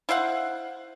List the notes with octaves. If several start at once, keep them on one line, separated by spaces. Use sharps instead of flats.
E4 C5 F5 F#5